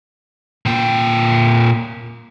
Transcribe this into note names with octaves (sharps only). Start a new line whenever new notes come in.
A#2 G5